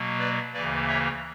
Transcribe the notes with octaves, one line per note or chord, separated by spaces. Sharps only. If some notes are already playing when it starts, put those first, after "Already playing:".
Already playing: B2 F#3 A#3
B4 D5
D2 C#3 E3 A#3 B4 D5
C#5 E5